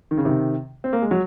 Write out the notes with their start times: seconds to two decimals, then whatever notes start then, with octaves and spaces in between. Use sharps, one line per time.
0.11 D#3
0.17 C#3
0.25 C3 D#3
0.84 C4
0.93 A#3
1.02 G#3
1.11 F#3